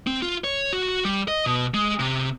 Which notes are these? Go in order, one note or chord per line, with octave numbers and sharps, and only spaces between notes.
C4
F4
C#5
F#4
G3
D#5
B2
G#3
C3